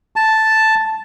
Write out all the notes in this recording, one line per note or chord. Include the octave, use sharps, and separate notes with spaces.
A5